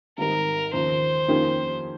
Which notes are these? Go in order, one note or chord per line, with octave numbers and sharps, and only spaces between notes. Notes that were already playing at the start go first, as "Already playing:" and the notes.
G#1 G#2 G3 C4 A#4
D#2 C#3 F3 C5
F2 D#3 A#3 C#4 G4